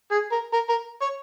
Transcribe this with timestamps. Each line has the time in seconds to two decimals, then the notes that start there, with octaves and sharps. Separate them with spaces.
0.11 G#4
0.32 A#4
0.53 A#4
0.69 A#4
1.01 C#5